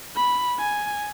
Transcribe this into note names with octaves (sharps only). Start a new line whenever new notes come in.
B5
G#5